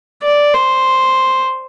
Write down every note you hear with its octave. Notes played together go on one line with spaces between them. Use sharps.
D5
C5